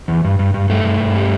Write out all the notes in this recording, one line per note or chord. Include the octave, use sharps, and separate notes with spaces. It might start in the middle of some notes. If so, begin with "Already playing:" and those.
E2
G2
G2
G2
G2 A3
G2
G2
G3